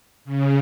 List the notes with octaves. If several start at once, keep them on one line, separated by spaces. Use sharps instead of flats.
C#3